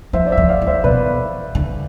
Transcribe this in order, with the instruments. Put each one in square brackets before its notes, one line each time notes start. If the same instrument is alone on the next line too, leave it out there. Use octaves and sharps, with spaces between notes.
[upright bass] F3 [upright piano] C5 E5
[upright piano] D5
C5 E5
[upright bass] F3
[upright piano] D5 F5
[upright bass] E3
[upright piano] C5 E5
[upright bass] B2 [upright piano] B4 D5
[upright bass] D3